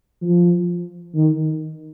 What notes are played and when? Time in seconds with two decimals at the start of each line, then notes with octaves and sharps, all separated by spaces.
0.22 F3
1.15 D#3